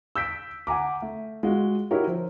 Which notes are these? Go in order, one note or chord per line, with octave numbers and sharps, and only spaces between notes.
E6 G6 B6 D7
F#5 G#5 A#5 D6
A3
G#3 F4 F#4
D#4 E4 F#4 G4 A#4 C#5
F3